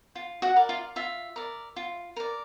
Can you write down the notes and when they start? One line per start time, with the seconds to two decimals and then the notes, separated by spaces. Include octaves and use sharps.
0.15 F4
0.42 F#4 F#5
0.56 A#4 D5
0.69 F4 F5
0.96 F4 E5
1.36 A#4 D5
1.76 F4
2.16 A#4 D5